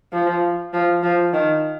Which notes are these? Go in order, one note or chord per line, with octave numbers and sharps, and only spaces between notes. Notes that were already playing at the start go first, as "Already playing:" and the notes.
F3
F3
F3
D#3